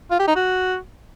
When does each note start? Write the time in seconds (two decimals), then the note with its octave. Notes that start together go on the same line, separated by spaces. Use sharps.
0.11 F4
0.19 G4
0.28 D#4
0.36 F#4